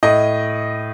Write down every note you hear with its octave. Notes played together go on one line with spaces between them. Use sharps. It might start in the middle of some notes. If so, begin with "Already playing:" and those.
A2 D#5